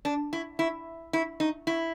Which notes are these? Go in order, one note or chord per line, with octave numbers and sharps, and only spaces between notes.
D4
E4
E4
E4
D#4
E4